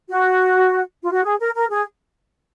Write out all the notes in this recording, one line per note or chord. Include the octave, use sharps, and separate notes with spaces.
F#4
F4
F#4
G#4
A#4
A#4
G#4